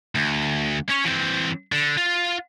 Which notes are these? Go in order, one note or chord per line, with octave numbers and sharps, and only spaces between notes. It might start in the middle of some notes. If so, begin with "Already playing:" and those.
D2
C#4 C#5
E3 C4
D3
F4